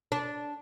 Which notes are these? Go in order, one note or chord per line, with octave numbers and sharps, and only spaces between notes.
D4